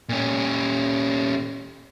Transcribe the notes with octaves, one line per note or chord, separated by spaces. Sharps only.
A#2 C#4